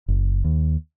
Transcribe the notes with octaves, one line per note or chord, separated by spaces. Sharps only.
F#1
D#2